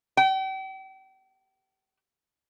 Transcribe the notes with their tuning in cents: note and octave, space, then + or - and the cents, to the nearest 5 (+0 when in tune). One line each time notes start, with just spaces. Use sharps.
G5 -40